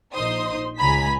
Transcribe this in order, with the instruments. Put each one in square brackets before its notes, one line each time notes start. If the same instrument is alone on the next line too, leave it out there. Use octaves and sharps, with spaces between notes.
[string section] A#1 D#4 C5 C6 D#6
C#2 G#5 A#5 B5 B6